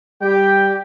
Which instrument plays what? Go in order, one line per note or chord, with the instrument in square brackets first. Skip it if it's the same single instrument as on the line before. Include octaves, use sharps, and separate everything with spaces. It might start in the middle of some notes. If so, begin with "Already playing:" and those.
[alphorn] G3 [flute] G4 [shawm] G5